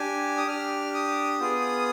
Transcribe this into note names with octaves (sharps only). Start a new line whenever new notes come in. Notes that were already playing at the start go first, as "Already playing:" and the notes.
Already playing: D4 G4 G#5
D#6
D4 G4 F6
D#6
B3 F4 G#4